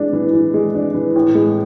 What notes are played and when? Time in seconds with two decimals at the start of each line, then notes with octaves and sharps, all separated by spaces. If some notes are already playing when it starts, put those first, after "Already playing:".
Already playing: E3 G#3 D4
0.13 E3
0.33 E3
0.54 G#3
0.75 D4
0.94 E3
1.16 A2
1.35 G#3